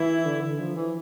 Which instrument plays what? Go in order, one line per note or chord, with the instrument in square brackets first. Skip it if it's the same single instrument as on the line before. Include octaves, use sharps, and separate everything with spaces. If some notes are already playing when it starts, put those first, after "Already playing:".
Already playing: [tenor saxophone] E3 [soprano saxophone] E4
[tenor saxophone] D3
D3
F3
E3